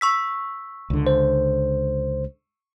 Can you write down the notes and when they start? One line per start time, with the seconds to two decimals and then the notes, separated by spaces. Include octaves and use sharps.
0.01 C#6 E6 B6
0.90 C#2 D3
1.07 C5